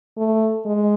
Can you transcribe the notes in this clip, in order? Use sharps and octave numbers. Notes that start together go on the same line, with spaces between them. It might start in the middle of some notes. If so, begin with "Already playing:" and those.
A3
G#3